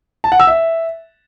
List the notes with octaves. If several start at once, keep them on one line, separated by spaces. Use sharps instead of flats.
A5
F#5
E6
E5